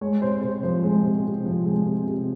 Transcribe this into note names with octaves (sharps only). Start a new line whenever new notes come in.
G#3 C#5
C3 C5
C3 C5
F3 C5
G#3
C3
C3
F3
G#3
C3
C3